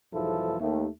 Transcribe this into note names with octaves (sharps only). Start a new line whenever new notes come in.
B1 E2 G#2 F3 E4 A4
D#2 A3